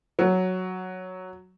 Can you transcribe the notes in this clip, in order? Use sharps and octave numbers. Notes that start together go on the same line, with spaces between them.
F#3